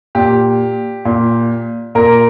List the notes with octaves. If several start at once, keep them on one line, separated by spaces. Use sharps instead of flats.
A#2 G4
A#2
A#2 A#4